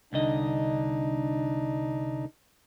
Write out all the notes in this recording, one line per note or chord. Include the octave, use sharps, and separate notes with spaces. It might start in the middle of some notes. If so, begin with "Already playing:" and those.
C2 D3 D4 D#4 D#5